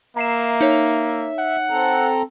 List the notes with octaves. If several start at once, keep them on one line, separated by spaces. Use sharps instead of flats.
A#3 E5 A#5 C7 E7
D#4 C#5
F#5
C4 A4 A#5